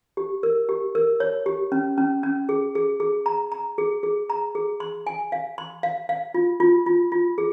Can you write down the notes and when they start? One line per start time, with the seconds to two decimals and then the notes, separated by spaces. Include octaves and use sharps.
0.17 G4
0.43 A#4
0.69 G4
0.95 A#4
1.20 C#5
1.46 G4
1.72 C#4
1.98 C#4
2.23 C#4
2.49 G#4
2.75 G#4
3.00 G#4
3.26 A#5
3.52 A#5
3.78 G#4
4.03 G#4
4.30 A#5
4.55 G#4
4.80 C6
5.07 G#5
5.32 F5
5.58 C6
5.83 F5
6.09 F5
6.34 F4
6.60 F4
6.86 F4
7.12 F4
7.38 G#4